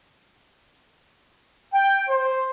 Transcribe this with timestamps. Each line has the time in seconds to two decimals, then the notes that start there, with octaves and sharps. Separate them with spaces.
1.73 G5
2.09 C5